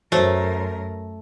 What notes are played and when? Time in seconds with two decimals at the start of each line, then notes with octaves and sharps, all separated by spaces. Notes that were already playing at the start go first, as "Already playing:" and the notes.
0.12 F#2 A3 F#4 A#4 C5 C#5